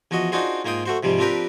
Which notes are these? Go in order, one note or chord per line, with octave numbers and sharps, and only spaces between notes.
E2 F3 F#4 D#5
D4 D#4 F4 F#4 G#4 C5
G#2 A#3 F4 G5 D#6
A3 F#4 C5
G#2 C3 F3 G3
F3 C4 D4 G4 A#4 B4